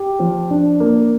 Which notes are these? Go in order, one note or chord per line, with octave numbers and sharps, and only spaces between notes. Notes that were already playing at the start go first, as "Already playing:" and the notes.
Already playing: G4
F3
D4
A#3